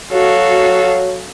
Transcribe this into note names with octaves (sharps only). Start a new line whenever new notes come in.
F#3 F#4 A4 F5